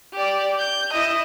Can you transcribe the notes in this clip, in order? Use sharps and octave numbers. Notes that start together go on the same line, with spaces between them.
G4 D5
G6
E4 D#5